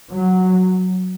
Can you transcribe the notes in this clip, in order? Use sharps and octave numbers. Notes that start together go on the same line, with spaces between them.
F#3